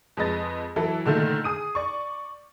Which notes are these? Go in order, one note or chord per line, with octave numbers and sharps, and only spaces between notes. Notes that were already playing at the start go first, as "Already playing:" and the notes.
F2 G#3 B4 D#5 A6
E3 F#3 E4 A4
A#2 D3 D#3 A3
G#4 D#6 D#7
D5 C#6